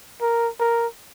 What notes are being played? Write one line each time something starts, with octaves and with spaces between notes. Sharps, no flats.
A#4
A#4